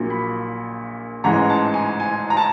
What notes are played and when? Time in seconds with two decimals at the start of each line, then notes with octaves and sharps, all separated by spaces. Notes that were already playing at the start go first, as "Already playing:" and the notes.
Already playing: A#1 A#2 F#3 A#3
0.10 B5
1.24 A1 G#2 E3 G#3 A#5
1.49 A5
1.74 G#5
2.00 G#5
2.30 A#5
2.37 A5